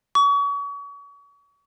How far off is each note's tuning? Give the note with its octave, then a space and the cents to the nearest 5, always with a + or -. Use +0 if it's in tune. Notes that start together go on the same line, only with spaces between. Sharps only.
C#6 +35